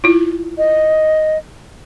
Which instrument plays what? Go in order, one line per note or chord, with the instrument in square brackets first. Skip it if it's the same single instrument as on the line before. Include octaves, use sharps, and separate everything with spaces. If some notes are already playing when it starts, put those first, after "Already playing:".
[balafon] E4 F4
[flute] D#5